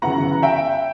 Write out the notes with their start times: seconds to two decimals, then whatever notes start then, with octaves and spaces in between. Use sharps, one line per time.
0.02 G1 F#2 C#3 E3 F#5 A#5
0.43 E5 G5